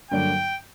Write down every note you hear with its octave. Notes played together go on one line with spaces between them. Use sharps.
G2 D3 F#3 A#3 D4 G5